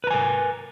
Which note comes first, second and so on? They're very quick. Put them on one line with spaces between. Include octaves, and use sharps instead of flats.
B4 A#5 G#5 A#4